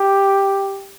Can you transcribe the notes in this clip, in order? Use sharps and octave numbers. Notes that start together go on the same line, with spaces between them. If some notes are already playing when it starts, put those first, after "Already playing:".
Already playing: G4